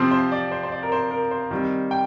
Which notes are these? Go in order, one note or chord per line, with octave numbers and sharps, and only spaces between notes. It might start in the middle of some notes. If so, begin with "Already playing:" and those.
Already playing: C3 F3 C4 C5
C5
D5
C5
C5
D5
A#4
C5
A#4
C5
D#3 G3 C4
G5